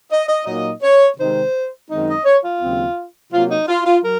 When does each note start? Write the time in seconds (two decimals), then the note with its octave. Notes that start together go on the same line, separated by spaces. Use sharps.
0.11 D#5
0.28 D#5
0.46 A#2 F#3 A#3 D#4 D#5
0.82 C#5
1.18 C3 D#3 G#3 C4 D#4 C5
1.90 F#2 D#3 G#3 C4 D#4
2.08 D#5
2.25 C#5
2.43 F4
2.60 D#2 C#3 F#3 C4
3.32 C3 F#3 A#3 F4
3.50 D#4
3.68 F4
3.85 F4
4.03 F#3 A#4